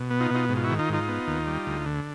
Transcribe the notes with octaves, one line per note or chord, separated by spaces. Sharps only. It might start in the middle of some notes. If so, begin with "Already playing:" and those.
Already playing: B2
B3
D#4 F4
B2 D#4 F4
G#2
F4
E4 F#4
D#3
D#4 F4
G#2 D#4 F4
B3
D#2
G3
D2
D3